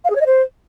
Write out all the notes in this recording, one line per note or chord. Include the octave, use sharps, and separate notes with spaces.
F5
G#4
C#5
D#5
C5